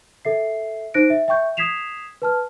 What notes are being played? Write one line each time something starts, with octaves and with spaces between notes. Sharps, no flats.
A4 E5 C7
D#4 C5 F#6 A#6 D7
E5
E5 G5 C#6 G6
D#6 G#6 B6 C7 E7 F7
B4 A5 F6